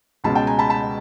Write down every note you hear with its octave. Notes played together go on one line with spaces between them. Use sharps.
C#2 B2 G#3 C#4 A5 B5
G5 A5
G#5 A#5
A5 B5
A5 B5